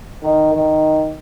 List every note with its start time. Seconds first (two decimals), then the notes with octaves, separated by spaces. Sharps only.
0.23 D#3
0.54 D#3